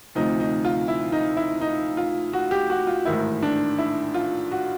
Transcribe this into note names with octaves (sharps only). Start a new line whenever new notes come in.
D2 C3 F3 D#4
D#4
F4
E4
D#4
E4
D#4
F4
F#4
G4
F#4
F4
A1 G#2 D#3 E4
D4
E4
F4
F#4